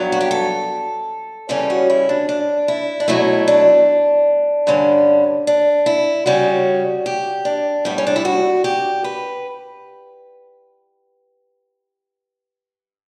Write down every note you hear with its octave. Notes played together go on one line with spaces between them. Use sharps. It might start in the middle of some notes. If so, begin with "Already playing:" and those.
Already playing: G2 F#3 B3
F#4
G4
A4
C#3 E3 G3 C#4 A4
F#4
E4
D4
D4
E4
D4
B2 F#3 A3 E4
D4
G2 D3 G3 C#4
D4
E4
C#3 G3 C#4 F#4
G4
D4
A2 G3 B3
C#4
D4
E4
F#4
G4
B4